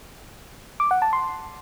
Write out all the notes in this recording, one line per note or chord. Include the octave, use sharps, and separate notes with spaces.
D6
F#5
A5
C6